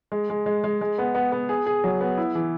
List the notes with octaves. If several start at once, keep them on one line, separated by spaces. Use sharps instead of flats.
G#3
G#3
G#3
G#3
G#3
B3
B3
B3
G#4
G#4
F#3
B3
E4
E3